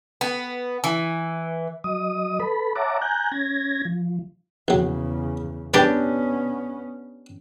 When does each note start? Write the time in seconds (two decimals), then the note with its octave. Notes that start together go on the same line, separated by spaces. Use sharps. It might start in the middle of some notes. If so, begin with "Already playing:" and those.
0.21 B3
0.84 E3
1.84 F#3 D#5 D#6
2.40 A4 B4 B5
2.75 C#5 E5 F#5 A5 A#5 D6
3.02 G#5 A#5 F#6 G6
3.32 C#4 G#6 A#6
3.85 F3
4.68 A#1 E2 C#3 F#3
5.74 G3 B3 C#4 D4 G4 A#4 B4